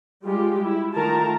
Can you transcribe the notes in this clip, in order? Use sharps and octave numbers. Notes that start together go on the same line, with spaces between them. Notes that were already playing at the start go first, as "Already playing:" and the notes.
G3 G#3 F4 G4
E4
D#3 A3 F4 A#4 A5 A#5